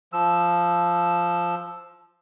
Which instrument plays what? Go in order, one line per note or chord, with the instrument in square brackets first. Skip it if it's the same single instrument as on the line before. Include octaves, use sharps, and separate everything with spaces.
[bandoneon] F3 E6